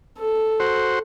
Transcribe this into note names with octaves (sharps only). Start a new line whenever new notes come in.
A4
F#4 C5